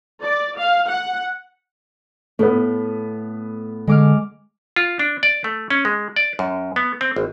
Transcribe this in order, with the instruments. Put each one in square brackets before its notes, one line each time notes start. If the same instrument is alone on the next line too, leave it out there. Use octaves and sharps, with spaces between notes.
[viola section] D5
F5
F#5
[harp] A2 [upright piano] A3 B3
[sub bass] D3 [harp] G#3 D6 F6
[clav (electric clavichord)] F4
D4
D5
A3
C#4
G#3
D5
F#2
B3
C4
G#1